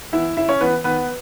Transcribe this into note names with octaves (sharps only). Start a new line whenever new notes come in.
E3 B3 E4 E5
C#3 E4 E5
C#4 C#5
E3 B3 B4
D#3 B3 B4